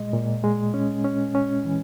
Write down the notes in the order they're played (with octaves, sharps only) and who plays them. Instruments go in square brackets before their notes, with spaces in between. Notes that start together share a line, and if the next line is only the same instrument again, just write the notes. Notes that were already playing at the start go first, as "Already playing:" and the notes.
Already playing: [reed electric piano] A#2 G#3 D#5
A#2
G#3
C#4
C#4
C#4
E3